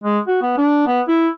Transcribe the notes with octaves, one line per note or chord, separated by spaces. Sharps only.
G#3
F#4
B3
D4
B3
E4